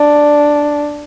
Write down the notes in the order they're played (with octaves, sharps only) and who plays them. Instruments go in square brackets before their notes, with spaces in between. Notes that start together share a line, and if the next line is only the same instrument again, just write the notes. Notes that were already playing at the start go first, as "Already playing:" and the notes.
Already playing: [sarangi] D4